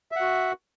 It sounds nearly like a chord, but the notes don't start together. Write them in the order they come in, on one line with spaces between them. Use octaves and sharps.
E5 F#5 F#4